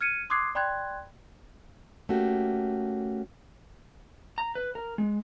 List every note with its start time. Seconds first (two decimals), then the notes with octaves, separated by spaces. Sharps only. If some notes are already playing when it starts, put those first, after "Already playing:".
0.01 F6 G#6 C#7 D#7
0.30 C6 D6 D#6 F#6 G#6 C7
0.55 D5 G5 B5 C6 F#6 G#6
2.09 A3 A#3 C#4 F#4 G4
4.38 A#5
4.55 B4
4.75 A#4
4.98 G#3